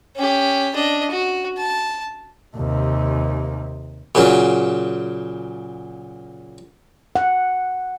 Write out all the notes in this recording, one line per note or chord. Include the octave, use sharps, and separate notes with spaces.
C#4 G4
D4 D#5
F#4
A5
D#2 C3
A#2 C#3 F#3
F#5